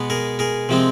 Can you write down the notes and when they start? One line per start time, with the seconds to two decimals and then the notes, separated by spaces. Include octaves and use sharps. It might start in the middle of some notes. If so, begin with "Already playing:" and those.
Already playing: B2 G#3 B3
0.10 G#4 A#4
0.39 G#4 A#4
0.69 C3 F3 G#3 C4